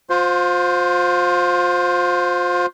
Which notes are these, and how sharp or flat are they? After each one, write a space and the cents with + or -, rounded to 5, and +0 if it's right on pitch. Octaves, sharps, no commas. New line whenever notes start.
F4 +30 C5 +0